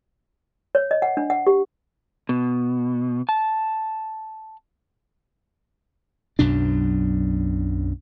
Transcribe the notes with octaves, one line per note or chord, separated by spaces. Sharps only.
C#5
D#5
F#5
D4
F#5
G4
B2
A5
B1 F#2 B2 D4